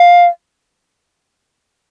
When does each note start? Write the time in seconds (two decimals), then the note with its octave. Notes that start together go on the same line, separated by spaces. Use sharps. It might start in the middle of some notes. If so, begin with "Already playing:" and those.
Already playing: F5